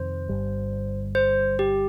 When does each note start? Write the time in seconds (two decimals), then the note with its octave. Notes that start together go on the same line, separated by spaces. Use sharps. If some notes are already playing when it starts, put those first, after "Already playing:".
Already playing: F2 C3 D#3 C5
0.29 G1 G2 G3
1.15 C5
1.59 G4